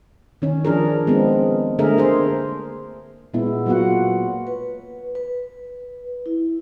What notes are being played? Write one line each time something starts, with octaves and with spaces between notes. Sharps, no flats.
D#3 C#4
F3 D4 G#4 A#4
G#3 B3 C4
D3 A3 G#4 A#4 E5
A#3 G#4 C5
A#2 G#3 B3 E4
F#3 A#3 B3 F4 F#4 F#5
B4
B4
E4